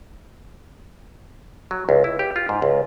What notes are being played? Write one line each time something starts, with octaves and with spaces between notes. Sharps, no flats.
F#3
C#2
E4
G4
F4
G#2
C#2